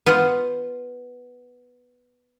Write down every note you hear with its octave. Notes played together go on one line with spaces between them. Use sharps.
B3 F4 C5 F#5